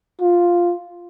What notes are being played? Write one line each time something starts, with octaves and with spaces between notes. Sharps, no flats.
F4